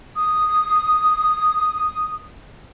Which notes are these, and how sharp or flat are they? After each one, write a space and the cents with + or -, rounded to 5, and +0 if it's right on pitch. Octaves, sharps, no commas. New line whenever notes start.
D#6 -5